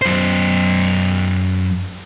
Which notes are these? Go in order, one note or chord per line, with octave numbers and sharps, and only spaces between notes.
F#2 C5